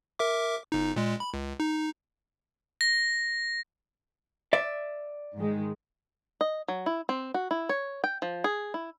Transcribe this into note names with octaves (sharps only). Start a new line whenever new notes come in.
A#4 E5 D6
G1 D#4
A#2 G#3
B5
C#2
D#4
A#6
D5 E5
G#2 D#3 G#3
D#5
F#3
E4
C4
F#4
E4
C#5
G5
F3
G#4
E4